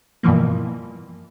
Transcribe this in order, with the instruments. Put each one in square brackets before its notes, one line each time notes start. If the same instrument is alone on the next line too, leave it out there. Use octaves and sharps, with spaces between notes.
[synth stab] G2 B2 E3 F3 A#3